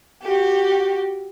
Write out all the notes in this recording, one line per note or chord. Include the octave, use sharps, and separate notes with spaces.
F#4 G4